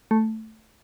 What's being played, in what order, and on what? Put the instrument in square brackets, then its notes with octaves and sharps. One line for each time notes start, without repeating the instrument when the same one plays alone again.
[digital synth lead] A3